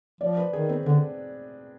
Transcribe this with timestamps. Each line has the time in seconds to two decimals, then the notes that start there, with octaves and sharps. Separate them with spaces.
0.21 F3 D5
0.37 B4
0.53 D#3 G#4
0.69 C4
0.86 D3 D4